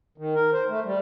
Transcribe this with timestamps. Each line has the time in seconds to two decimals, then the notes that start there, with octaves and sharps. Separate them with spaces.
0.18 D#3
0.35 A#4
0.53 C5
0.68 A3
0.85 G3